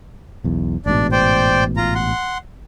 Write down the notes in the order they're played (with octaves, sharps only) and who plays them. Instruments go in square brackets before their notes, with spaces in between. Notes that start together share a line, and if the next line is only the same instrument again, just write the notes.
[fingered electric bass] B1 E2
[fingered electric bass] A1 G#2 B2 [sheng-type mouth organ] D4 D5
[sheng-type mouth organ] C5 D5 G5
F4 A#5
F#5 C6